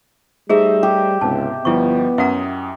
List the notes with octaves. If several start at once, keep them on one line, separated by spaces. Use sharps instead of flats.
G3 A3 D#4 G#4 C5 D#5 E5
G4
C#2 G#2 C3 B3 A5
G1 F3 G3 B3 E4 C#6
F#2 C#4 E5 F#5 A#5 D#6